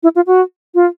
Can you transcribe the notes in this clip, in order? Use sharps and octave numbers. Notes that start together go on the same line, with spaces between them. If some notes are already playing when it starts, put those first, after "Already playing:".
E4
F4
F#4
F4